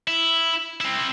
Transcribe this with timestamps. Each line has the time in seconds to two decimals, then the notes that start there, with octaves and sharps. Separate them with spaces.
0.07 E4
0.81 C4 E4